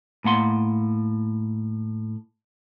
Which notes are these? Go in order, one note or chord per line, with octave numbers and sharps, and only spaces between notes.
A2 A#3 F#5 C6